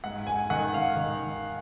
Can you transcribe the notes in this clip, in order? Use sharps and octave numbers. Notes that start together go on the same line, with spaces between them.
G#2 F#5
G#5
D#3 F#5
F5
D#3